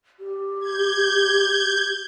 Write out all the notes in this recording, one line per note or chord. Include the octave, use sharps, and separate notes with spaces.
G4
G6 G#6